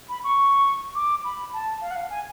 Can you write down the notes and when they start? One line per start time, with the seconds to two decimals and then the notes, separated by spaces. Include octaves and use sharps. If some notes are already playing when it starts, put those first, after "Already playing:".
0.09 B5
0.24 C#6
0.95 D6
1.25 B5
1.53 A5
1.81 F5
1.91 F#5
1.96 F5
2.10 G#5